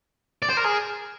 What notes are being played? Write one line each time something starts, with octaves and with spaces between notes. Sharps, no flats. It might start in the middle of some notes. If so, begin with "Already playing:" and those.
D5
C5
A#4
G#4